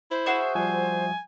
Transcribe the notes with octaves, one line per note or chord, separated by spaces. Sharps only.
E4 C5
F#4 G#4 E5
F3 G3 G#5